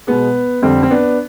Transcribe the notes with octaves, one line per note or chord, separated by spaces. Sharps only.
B2 G#3 B3
F2 D3 G3 C4
C4
B3 D4